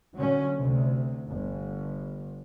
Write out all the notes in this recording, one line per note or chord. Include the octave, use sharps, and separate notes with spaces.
A#2 D3 F#3 C#4
D2 C3
G1